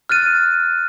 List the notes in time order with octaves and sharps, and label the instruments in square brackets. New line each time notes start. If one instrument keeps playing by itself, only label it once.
[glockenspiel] F6 F#6 A6 D#7